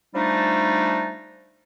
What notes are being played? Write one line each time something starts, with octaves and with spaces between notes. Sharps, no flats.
F3 G3 A3 D4 D#4